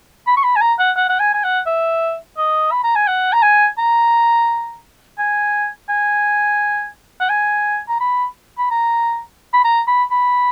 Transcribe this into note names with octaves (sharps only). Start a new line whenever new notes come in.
B5
C#6
B5
G#5
A#5
F#5
F#5
F#5
G#5
G#5
F#5
E5
D#5
B5
A#5
G#5
F#5
A#5
G#5
A#5
G#5
G#5
F#5
G#5
A#5
B5
B5
A#5
B5
A#5
B5
B5